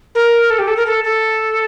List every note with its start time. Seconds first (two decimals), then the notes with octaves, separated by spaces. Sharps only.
0.15 A#4
0.50 A4
0.59 G4
0.67 A4
0.77 A#4
0.86 A4
1.04 A4